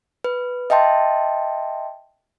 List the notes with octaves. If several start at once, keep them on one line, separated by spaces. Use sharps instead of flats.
B4
D#5 E5 G5 A5 C6